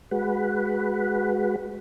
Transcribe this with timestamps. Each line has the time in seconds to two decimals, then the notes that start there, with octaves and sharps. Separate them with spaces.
0.11 G#3 F#4 B4